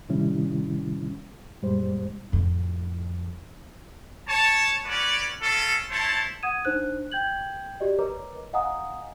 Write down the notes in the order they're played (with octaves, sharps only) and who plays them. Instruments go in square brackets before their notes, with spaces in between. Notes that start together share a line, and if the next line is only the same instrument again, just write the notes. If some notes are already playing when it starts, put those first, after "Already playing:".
[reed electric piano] A2 C3 D#3 G3 C#4 E4
F#2 A#2 G3 G#3 C5
[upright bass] F2 A2
[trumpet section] C#5 A5
C#4 F#4 B4 C#5 D5
C#4 F4 A4
E4 C5 C#5 A5
[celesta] F#5 D#6 G#6 D#7 E7
D4 D#4 C5 F#6
G5 G6 G#6 F#7
F#4 G4 D5 D#5
A#4 B4 C#5 D#5 A#5 D6
D#5 F5 F#5 G#5 A#5 D#6